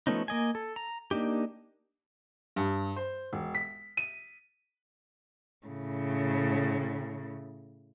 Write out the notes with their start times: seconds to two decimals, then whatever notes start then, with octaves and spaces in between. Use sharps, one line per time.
0.07 F3 A3 B3 C#4 D#4
0.28 A#3 D#5 G#5
0.55 A4
0.76 A#5
1.11 A#3 D4 D#4 G4
2.56 G2
2.96 C5
3.33 E1
3.55 B6
3.97 D#7
5.67 A2 C#3